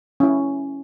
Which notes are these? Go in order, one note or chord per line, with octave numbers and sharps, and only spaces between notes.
C#4 E4